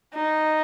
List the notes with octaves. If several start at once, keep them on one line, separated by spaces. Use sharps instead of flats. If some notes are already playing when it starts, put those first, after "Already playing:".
D#4